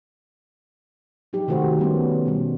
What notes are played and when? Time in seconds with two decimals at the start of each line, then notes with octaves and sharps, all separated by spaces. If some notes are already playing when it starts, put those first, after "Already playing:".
1.33 F3 F#3 D#4 G4
1.48 C3 D#3 A3 F#4 A4 C5
1.79 G3 B3 C#4
2.26 B2 G3